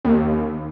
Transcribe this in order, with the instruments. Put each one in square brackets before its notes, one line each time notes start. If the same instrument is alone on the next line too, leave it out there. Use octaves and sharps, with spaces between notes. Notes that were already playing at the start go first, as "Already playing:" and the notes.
[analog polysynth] D#2